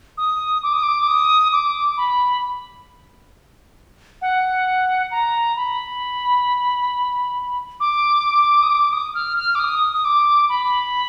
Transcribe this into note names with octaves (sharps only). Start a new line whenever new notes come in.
D#6
D6
D#6
D6
D#6
D6
B5
F#5
A#5
B5
D6
D#6
D6
D#6
F6
F6
D6
D#6
D#6
D6
B5